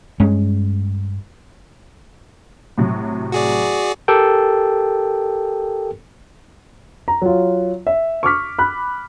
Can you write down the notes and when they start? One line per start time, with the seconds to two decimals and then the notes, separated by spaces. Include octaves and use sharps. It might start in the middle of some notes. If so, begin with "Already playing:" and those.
0.20 G2 G#3 C#4
2.78 A2 C3 F#3
3.32 F#4 G#4 D5
4.08 G4 A4 A#4 G5
7.08 A#5
7.22 F#3 F4
7.87 E5
8.23 C#6 D6 F6 B6
8.59 B5 F#6